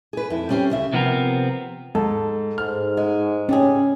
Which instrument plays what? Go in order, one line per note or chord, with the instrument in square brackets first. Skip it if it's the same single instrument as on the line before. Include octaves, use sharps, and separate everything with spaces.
[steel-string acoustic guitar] G#4 B4
F2 E4
G3 C4 C#4 G4 C5
D2 C#3 E5
[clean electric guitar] C3 F3 B3 C4 A#4
[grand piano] G#2 [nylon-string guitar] A4
[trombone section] G#2 [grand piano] F6
[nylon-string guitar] G#3
[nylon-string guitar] G3 G4 G#4 [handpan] C#4